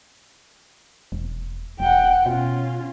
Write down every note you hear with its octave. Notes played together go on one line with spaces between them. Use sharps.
E1
E1 F#5 G5
B2 C#4 F4